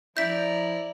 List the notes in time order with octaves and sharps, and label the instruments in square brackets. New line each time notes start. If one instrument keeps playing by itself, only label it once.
[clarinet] F3 [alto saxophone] E4 [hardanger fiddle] D5 A#5 [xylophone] G6 B6